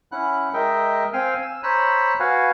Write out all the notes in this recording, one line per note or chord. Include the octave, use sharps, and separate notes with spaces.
C#4 E4 F#5 F#6
G#3 A#4 D#5 E5 G5
C4 F5 G5 G#5 F6
G#5 E6
C5 C#5 A#5 B5 E6 F#6
F#4 B4 F5 F#5 G#5